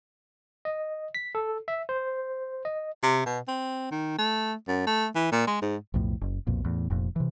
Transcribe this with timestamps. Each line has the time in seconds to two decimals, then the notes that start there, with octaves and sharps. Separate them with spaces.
0.65 D#5
1.15 B6
1.35 A4
1.68 E5
1.89 C5
2.65 D#5
3.03 C3
3.26 B2
3.48 C4
3.91 D#3
4.18 A3
4.68 F#2
4.87 A3
5.15 E3
5.32 A#2
5.47 G#3
5.62 G#2
5.94 B1 F2 A2
6.21 F#1
6.47 B1 F2 A#2
6.65 E2 A2
6.90 F1 F2 A#2
7.16 C3 E3